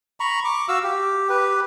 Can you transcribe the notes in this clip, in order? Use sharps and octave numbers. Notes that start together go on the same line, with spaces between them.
A#5 B5 C#6
C#6 D6
F#4 F5 E6
G4
G4 B4